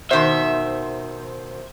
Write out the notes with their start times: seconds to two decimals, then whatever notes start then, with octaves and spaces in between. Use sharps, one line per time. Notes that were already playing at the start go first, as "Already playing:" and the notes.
0.11 B2 D#3 C5 E5